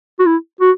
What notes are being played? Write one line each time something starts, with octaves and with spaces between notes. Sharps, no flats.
F#4
E4
F#4